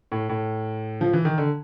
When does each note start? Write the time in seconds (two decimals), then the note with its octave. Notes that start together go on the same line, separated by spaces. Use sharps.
0.12 A2
0.29 A2
1.01 F3
1.13 E3
1.25 D#3
1.38 D3